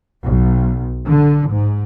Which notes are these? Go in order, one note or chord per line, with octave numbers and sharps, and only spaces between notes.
B1
D3
G#2